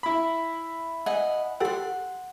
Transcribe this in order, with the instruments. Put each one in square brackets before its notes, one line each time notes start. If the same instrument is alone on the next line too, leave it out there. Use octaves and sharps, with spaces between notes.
[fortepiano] E4 B5
[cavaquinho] D#5 F#5 G#5
[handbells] G4 A4 G5 [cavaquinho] F#5 C6